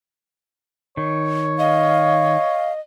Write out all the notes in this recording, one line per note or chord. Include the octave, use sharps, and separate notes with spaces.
D#3 C#5
D#5 F5